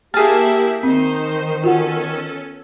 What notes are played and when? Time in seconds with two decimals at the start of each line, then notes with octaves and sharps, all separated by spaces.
0.14 A#3 E4 G4 G#4 E5 A5 F6
0.83 D#3 C4 D#4 C5
1.64 B3 C#4 F4 F#4 A4 F#5